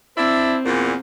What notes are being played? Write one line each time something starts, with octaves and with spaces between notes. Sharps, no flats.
C4 D4 E4
E2 A#2